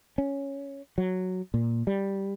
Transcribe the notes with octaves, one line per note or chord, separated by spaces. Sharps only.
C#4
F#3
A#2
G3